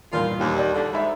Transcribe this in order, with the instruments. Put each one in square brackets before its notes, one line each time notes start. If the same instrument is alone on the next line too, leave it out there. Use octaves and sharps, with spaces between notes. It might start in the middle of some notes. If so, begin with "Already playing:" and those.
[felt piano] E2 G2 A#2 [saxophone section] D#3 F4
[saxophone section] D#2
[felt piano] D5
[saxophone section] D3
[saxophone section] G#2 [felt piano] E5 B5